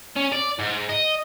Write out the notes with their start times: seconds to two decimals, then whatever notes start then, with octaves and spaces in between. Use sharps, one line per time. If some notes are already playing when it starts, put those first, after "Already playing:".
0.17 C#4
0.33 D5
0.59 G#2
0.89 D#5